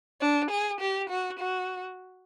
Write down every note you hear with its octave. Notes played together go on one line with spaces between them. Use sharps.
D4
G#4
G4
F#4
F#4